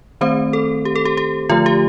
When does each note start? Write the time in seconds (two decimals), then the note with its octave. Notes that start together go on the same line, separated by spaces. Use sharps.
0.21 D#3 A3 C4 C5
0.53 A4
0.85 G4
0.96 A4
1.05 G4
1.17 G4
1.49 D3 F3 A3 F4
1.66 G4